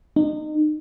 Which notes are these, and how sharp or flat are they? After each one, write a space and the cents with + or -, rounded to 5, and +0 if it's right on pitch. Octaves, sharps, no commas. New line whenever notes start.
D#4 -30